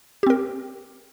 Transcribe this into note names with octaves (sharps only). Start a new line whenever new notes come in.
C4 G4 A#4